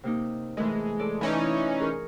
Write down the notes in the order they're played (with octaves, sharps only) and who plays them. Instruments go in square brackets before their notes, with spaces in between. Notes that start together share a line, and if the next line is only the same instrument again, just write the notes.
[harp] C3 A#3 D#4
[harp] E3 A3 A#4 [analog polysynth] G#3
[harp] A4 D5
[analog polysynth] E3 C#4 D#4 [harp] D5 G#5
[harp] G#4 A#4 C#6